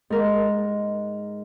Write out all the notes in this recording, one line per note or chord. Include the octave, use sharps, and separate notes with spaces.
G#2 A#4